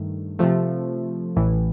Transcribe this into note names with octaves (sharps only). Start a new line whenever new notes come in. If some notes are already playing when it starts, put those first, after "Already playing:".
Already playing: G2 D#3 A3
C3 F3 A3
A1 A2 E3